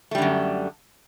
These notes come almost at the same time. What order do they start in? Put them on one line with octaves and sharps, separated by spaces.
A3 G3 D3 F#2